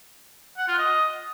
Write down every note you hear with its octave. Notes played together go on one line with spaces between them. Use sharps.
F#5
F4
D#5